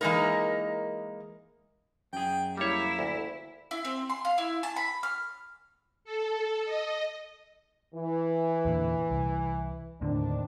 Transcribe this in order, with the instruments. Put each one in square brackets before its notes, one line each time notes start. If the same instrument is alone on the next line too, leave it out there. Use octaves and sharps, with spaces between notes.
[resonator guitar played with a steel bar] E3 G#3 A#3 D#4 A#4
[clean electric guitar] F#2 G#4 [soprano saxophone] G5
[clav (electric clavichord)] G3 C#5 [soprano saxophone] A#3 [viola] E4
[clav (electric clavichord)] D2
[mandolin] E4
C4
C6
F5
E4
A5
B5
F6
[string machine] A4
D#5
[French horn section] E3
[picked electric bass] E2 A#2 D3
C2
[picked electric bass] D#2 A2 D3 [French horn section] D#3 C4 D4